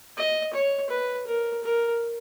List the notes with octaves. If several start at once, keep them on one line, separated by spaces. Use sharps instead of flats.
D#5
C#5
B4
A#4
A#4